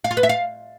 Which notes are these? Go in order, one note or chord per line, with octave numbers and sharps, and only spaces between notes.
F5
F4
B4
E5
F5